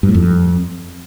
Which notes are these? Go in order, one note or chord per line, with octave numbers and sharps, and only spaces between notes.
G2
A2
F2